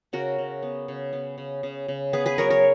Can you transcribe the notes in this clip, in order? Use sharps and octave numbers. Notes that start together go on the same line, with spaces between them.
C#3 F#4 A#4
C#3
B3
C#3
B3
C#3
C#3
C#3
B3 G#4 B4
G#4 B4
F#3 A#4 C#5
A#4 C#5